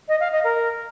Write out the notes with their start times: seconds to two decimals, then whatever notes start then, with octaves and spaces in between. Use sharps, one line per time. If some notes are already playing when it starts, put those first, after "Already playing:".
0.08 D#5
0.20 F5
0.32 D#5
0.44 A#4